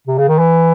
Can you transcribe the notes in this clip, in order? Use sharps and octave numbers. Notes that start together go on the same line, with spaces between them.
C3
C#3
D#3
E3